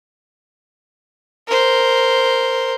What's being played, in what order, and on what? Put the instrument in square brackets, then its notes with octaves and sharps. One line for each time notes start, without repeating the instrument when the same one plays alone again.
[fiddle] A#4 C5